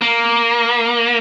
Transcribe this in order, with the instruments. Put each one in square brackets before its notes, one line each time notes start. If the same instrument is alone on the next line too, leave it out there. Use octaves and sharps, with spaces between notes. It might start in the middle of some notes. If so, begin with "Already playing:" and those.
[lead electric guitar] A#3